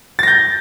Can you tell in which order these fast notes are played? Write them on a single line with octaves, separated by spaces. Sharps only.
A6 A#6 G6